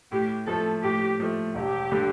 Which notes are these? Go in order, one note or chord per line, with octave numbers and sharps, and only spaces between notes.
A2 G4
F3 A3 A4
A2 G4
F3 A3
E1 G4
D3 G3